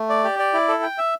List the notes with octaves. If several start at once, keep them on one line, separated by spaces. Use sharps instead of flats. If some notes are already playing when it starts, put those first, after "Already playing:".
Already playing: A3
D5
G4
D5
E4
A4
G5
E5